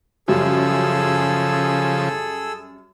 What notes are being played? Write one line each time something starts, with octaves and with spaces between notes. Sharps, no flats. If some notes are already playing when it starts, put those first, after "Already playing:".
F#2 C#3 F3 G3 G#4 A4 E6